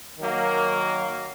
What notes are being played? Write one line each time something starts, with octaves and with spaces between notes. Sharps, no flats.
D#3 F#3 A#3